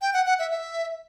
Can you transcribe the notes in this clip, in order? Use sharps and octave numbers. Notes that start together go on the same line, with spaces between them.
G5
F#5
F#5
E5
E5